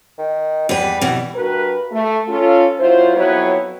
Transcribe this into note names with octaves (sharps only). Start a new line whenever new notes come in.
D#3
E2 G3 B4
B2 E3
G2 F#4 A#4 B4
A3
C#4 F4 A4
F#3 E4 F4 C5
F2 F#3 B3 E4 B4 C#5